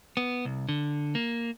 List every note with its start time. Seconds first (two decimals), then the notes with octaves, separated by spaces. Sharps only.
0.17 B3
0.45 C2
0.69 D3
1.15 A#3